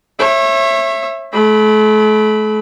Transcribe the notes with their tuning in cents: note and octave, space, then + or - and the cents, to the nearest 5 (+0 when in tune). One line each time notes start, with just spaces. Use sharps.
C#5 -30 E5 +10
A3 -40 B5 +0